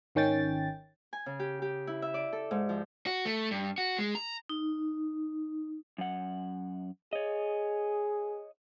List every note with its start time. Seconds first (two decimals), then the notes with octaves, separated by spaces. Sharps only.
0.15 G#1 D#3 C#4 G5 A6
1.13 G#5
1.26 C#3
1.39 G4
1.62 G4
1.87 E4
2.02 E5
2.14 D5
2.33 A4
2.51 G#2
2.69 F3
3.07 F#4
3.25 A3
3.51 G2
3.78 F#4
3.98 G#3
4.15 A#5
4.49 D#4
5.98 F#2 F#5
7.13 G#4 C#5 D#5